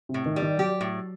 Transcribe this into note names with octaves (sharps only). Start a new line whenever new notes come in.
C3
A2
D#3
G3
D#3
F#3 G4
A2